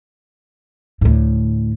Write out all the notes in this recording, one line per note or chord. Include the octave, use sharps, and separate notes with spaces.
D2 A2